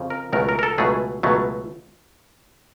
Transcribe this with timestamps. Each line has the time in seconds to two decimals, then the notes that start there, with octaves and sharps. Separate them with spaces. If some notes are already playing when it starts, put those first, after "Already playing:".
Already playing: F2 C#3 F3
0.10 A#4
0.33 C#2 B2 F#3 A3 A#4
0.49 A#4
0.59 A#4
0.63 A4
0.78 C#2 B2 F#3 A3 G#4
1.23 C#2 B2 F#3 A3